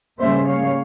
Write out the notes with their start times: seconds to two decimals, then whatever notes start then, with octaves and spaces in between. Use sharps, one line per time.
0.19 C#3 G3 A#3 C#4 C5 E5
0.48 C#5 F5